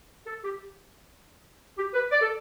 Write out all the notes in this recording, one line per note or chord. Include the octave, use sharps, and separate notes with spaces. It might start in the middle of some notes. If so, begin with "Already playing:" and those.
A4
G4
G4
B4
D5
A4